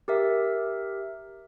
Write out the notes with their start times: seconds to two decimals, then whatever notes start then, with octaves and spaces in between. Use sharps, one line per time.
0.08 G4 A#4 E5